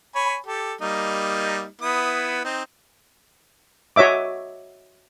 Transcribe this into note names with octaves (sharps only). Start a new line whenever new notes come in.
C#5 G#5 B5
G4 A4
G3 A#3 D#4
B3 E4 D#6
C4 D#4
F#4 C#5 D#5 E5 D6